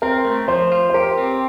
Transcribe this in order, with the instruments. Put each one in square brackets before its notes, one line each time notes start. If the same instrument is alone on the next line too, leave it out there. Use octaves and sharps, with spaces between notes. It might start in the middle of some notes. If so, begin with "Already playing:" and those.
[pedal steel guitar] C4 [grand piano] A#4
[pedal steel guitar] A3
[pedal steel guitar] F3 [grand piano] C5
[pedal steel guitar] F4
[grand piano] C5
[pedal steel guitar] G4 [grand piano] A#4
[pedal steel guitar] C4